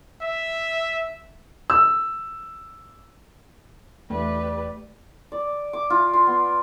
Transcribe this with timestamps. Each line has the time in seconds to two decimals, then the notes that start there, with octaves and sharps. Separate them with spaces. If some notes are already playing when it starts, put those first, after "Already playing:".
0.22 E5
1.70 E6
4.10 E2 A3 G4 B4 D5
5.32 D5
5.73 D6
5.90 F4
6.13 C6
6.27 B3